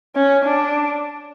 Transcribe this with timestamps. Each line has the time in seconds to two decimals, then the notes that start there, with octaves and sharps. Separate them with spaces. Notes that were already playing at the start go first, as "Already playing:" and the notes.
0.15 C#4
0.44 D4